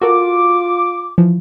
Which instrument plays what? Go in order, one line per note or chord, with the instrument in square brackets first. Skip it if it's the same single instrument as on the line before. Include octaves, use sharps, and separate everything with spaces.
[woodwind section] F4 D6 [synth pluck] F#4 A4 A#4
[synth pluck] E3 F3